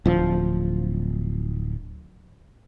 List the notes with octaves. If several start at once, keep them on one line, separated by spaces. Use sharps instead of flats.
D1 F3